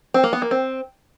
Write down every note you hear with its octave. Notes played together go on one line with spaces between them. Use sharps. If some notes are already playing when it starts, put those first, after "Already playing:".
C4
A#3
B3
A#3
C4